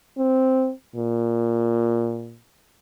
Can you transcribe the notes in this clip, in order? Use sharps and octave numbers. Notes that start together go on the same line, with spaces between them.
C4
A#2